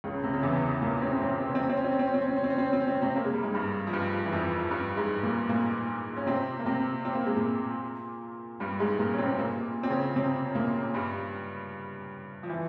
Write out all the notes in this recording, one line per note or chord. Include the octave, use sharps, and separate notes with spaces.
C#2 C#3
C3
C#3
E2 E3
A#2 A#3
C#4
C3 C4
C3 C4
C4
C#4
C4
C#4
C4
C#4
C4
C#4
C4
C#4
C4
C#4
C4
C#4
C4
C#4
C4
C#4
C4
C#4
C4
C#4
C3 C4
A#3
G#3
G3
G#2 G#3
G2 G3
F3
G2 G3
E3
F2 F3
G2 G3
G#2 G#3
A#2 A#3
A#2 A#3
C#4
C3 C4
A#3
C3 C4
C4
A#3
G#3
A#2 A#3
G2 G3
G#2 G#3
A#2 A#3
C#4
C3 C4
A#2 A#3
C4
C#3 C#4
C3 C4
A#2 A#3
G2 G3
F3
E3